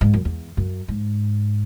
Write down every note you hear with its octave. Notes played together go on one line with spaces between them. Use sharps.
G#2
F#2
E2
F#2
G#2